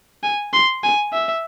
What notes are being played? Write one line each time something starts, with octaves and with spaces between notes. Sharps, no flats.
G#5
C6
G#5
E5